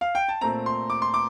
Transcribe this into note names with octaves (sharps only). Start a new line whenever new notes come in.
F5
G5
A5
A#2 A3 C4 A#5
C6
D6
C6
D6